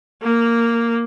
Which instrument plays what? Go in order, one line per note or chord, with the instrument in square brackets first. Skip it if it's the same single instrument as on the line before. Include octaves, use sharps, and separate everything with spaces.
[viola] A#3